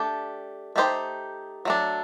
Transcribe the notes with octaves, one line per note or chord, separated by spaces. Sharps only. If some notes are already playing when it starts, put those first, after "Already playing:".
Already playing: A3 D4 G4 D5
A3 D#4 G4 C5
F#3 A3 D4